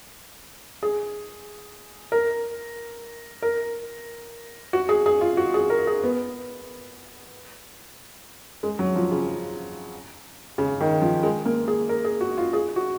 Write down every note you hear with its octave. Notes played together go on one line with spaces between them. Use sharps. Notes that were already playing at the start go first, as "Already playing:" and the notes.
G#4
A#4
A#4
F#4
G#4
G#4
F4
F#4
G#4
A#4
G#4
B3
G#3
F#3
F3
C#3
C#3
D#3
F3
G#3
A#3
G#4
A#4
G#4
F#4
F4
G#4
F#4